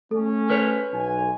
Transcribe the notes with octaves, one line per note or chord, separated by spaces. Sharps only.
A3 C#4 A4
A#4 B4 C#5
B1 G#5